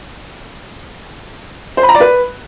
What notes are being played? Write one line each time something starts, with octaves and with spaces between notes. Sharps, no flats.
C5
B5
A#5
D5
B4